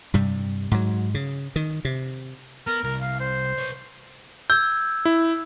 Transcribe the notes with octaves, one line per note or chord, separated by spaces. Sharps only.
G2 C3 G3
G#2 F#3
C#3
D#3
C3
B3 A#4
C2 A#4
F5
C5
B4 C#5
E6 G6 G#6
E4